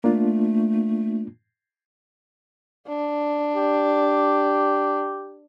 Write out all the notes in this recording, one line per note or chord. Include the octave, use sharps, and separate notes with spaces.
A3 A#3 D4 F4
D4
G4